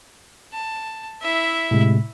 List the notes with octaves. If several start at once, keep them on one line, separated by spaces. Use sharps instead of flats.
A5
E4 E5
A2 C3 G#3